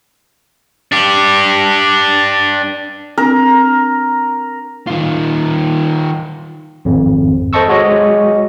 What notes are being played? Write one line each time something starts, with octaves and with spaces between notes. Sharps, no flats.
D4 G4
C4 D4 A#4
D#3 F4
G#1 F2
A4 C5 D#5 A5 C#6 E6
G#3 F#4 C#5 D#5